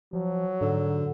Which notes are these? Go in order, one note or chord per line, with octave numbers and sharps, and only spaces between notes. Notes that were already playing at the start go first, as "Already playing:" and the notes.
F3 F#3
G#2 D3